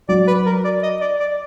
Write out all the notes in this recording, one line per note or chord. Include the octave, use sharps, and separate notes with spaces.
F#3 D5
B4
A#4
D5
D#5
D5
D5